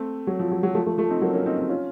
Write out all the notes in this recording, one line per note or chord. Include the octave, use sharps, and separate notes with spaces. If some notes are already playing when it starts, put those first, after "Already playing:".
Already playing: A3 C4
F#3
F3
F#3
F#3
F3 A3
F3 A3
F3 A3
C4 D#4
F#3 A#3
A#3 C#4
C4 D#4
C4 D#4
C#4 F4